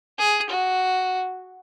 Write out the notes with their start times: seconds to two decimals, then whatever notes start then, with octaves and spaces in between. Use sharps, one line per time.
0.18 G#4
0.50 F#4